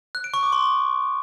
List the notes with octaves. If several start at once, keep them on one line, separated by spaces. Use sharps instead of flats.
F#6
D7
C#6
D6
C6